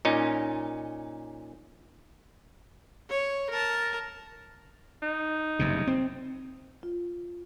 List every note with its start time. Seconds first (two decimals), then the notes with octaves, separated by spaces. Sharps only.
0.05 A#2 C#4 D#4
3.10 C#5
3.50 A#4 A5
5.02 D#4
5.59 F#1 G2 C3
5.87 C4
6.83 F4